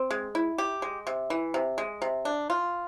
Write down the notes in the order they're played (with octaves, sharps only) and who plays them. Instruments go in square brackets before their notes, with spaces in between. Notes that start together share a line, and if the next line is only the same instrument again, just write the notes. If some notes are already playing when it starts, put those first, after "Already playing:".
Already playing: [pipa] C4
G#3
E4
G4
G#3
C3
E3
C3
G#3
C3
D4
F4